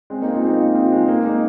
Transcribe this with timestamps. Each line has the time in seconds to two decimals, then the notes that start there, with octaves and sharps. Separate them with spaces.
0.10 G#3 C4
0.22 A#3 D#4
0.35 C4 F4
0.46 A#3 D#4
0.75 C4 F4
0.92 G#3
1.08 A#3
1.25 A#3 D#4